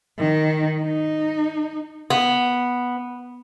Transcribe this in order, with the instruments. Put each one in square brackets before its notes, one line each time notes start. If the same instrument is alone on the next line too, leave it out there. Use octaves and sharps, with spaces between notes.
[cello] D#3
D#4
[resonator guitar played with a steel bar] B3